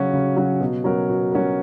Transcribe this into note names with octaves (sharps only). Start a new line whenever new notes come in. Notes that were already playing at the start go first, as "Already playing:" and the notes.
Already playing: C#3 F#3 C#4 F#4
C#3
F#3 C#4 F#4
B2
F#3 C#4 F#4 A#4
B2
F#3 C#4 F#4 A#4